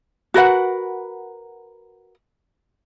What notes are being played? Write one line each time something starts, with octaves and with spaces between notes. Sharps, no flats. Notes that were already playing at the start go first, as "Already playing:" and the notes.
F#4 A#4 B4 F#5